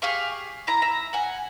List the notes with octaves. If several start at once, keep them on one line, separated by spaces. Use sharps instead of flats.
G4 G#4 F5 C#6
E4 A#5
E5 A#5
F#5 G#5